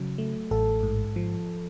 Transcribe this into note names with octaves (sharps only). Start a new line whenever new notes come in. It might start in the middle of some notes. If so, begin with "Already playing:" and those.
Already playing: C#3 F#3
A3
A1 A4
G#2
F3